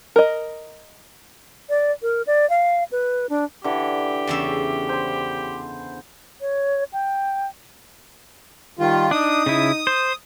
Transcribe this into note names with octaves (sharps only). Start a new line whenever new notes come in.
A#4 D#5
D5
A#4
D5
F5
B4
D4
D3 E3 G4
E2 C#3 E5
C5 C6
C#5
G5
D#3 G3 F4
D4 D#4 D#6
C#3 E4
C5